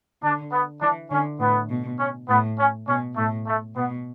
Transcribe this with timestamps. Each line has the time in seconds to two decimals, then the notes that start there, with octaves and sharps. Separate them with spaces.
0.22 D3 D4
0.52 B3
0.81 E3 D4
1.11 D3 C#4
1.40 A2 B3
1.70 B2
1.99 C#4
2.29 A2 B3
2.59 C#4
2.88 B2 C#4
3.17 A2 A3
3.47 A3
3.76 B2 B3